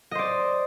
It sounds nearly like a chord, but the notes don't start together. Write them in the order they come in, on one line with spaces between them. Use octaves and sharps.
D#5 C5 D5